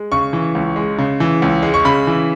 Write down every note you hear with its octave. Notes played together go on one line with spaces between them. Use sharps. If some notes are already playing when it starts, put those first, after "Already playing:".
Already playing: G#3
C#3 C#6
E3
C#2
G#3
C#3
E3
C#2
G#3
C#6
C#3 B5
E3